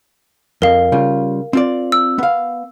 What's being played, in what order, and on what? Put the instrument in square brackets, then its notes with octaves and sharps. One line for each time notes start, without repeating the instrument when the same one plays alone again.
[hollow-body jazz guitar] F2 [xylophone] A#4 F5
[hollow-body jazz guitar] C#3 G3 F4
C4 F4 D5
[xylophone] E6
[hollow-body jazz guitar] B3 F5